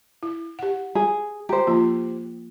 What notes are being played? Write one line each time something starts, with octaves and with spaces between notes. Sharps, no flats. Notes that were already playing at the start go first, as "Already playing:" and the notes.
E4
G4 F#5
G#4
G4 C5 A#5
F3 A#3 F4